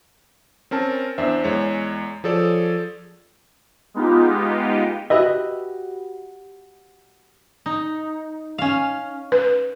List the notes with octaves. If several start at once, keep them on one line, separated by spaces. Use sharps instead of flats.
C4 C#4 A#4 A5
E2 D4 C5 E5
E2 G#3 C#5
F3 G#4 A4 C#5 D5
G#3 B3 D#4 F4 G4
F#4 G4 B4 D#5 E5
D#4
C#4 F5
B4